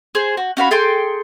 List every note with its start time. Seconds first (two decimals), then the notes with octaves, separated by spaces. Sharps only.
0.15 G#4 C5
0.37 F#4
0.57 C#4 F#4 F5 B5
0.71 G#4 A4 G5 C6